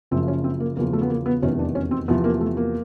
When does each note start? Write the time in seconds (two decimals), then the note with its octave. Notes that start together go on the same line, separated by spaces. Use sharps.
0.11 F#1 F#2 C#3 F3 C4
0.28 C#4
0.44 C4
0.60 A#3
0.76 E2 C#3 F3 A#3
0.93 A3
1.02 B3
1.10 A#3
1.26 B3
1.42 F1 E2 C3 D#3 C#4
1.59 D4
1.75 C#4
1.91 C4
2.08 E2 C3 F3 B3
2.24 A#3
2.41 A3
2.57 A#3